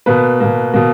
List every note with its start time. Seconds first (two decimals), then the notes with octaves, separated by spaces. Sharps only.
0.06 B2 A#3 B4
0.40 B2 A#3
0.74 B2 A#3